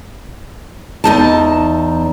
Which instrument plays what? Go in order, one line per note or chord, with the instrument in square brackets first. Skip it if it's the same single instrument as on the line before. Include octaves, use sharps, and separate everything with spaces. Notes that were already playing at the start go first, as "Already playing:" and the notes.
[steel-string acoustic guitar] E2 D#4 A5